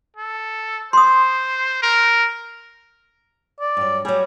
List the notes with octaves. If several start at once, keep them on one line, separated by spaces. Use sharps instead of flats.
A4
C5 C6 D#6
A#4
D5
G2 F#3
F#3 G3 G#4